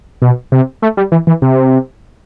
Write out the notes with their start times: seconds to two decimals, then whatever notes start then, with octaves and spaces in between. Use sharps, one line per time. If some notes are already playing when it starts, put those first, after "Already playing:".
0.22 B2
0.52 C3
0.82 A3
0.97 G3
1.12 E3
1.27 E3
1.42 C3